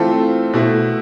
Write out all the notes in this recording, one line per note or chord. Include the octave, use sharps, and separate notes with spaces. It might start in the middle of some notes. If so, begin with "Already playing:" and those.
Already playing: E3 A3 C4 F4 A4
B2 A3 E4